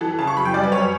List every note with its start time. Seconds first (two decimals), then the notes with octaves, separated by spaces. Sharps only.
0.01 E3 A4
0.19 C#3 A5
0.27 C#6
0.37 F#2 B5
0.45 G5
0.54 G3 D5
0.63 B4
0.72 F#2 C#5